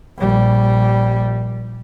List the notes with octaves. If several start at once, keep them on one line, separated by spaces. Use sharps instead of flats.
A#1 G3